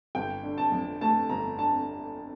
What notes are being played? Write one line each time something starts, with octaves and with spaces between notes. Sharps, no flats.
G1 G5
D3
A5
F2
A3 A5
G1 A#5
D3 A5